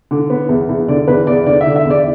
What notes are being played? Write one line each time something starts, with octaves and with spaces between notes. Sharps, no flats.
D3
B3
E2
E2
D3 D5
E2 B4
E2 D5
D3 D5
E5
D3
E5
E2
D5